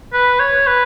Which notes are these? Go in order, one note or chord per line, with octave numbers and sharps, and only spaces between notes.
B4
C#5
B4